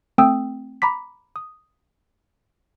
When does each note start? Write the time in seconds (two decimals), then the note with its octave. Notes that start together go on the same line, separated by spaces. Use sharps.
0.18 A3 C4 G5 D#6 E6
0.82 A#5 B5 D6 B6
1.36 D#6